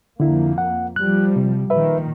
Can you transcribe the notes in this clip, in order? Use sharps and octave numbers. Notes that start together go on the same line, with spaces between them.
F2 D3 A#3 E4
F#5
F3 G3 F#6
C3
A#2 D#3 B4 E5